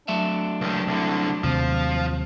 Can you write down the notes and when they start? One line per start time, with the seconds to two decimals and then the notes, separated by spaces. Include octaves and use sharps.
0.08 F#3 A3 D4 E5
0.61 C#2 D#3
0.87 C2 D3
1.44 D#2 C3 F3